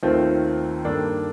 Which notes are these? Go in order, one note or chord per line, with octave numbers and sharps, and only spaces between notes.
D#2 D#3 A3 C4 F4
G2 D#3 A#3 D4 A4